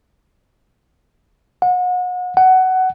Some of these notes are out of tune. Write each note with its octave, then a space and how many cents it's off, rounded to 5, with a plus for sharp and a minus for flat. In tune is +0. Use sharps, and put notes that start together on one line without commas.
F#5 -35
F#5 +15